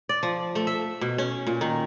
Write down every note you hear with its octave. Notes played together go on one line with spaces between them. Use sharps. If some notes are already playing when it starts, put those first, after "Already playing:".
D5
F3
A3
E5
B2
C#4
A#2
D#3